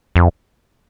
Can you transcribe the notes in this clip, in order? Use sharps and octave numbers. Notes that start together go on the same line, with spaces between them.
F2